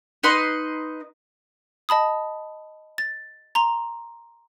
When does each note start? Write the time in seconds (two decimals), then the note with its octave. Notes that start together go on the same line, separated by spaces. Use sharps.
0.23 D#4 B4 D#5 C6
1.89 D#5 A5 B5 D#6
2.98 A6
3.55 A#5 C6 F7